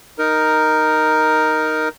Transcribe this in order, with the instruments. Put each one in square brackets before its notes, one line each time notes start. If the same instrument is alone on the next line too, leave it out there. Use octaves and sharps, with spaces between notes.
[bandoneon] D#4 A#4